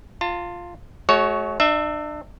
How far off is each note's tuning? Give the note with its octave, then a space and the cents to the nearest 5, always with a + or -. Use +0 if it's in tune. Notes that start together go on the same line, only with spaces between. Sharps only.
F4 +0 A5 +35
G#3 +45 F#4 +10 C#5 +0
D4 +40 E5 +0